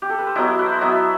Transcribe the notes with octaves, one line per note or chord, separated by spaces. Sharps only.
G4
A4
B4
C5
F#3 B3 E4 D#5
B4
C5
D#5
F#3 B3 E4 E5